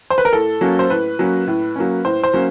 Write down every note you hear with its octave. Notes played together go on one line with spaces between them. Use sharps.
C5
B4
A#4
A2 A4
F#3 A#3 C#4
C5
A2 B4
F#3 A#3 C#4
A2
F#3 A#3 C#4
A2 C5
C5
F#3 A#3 C#4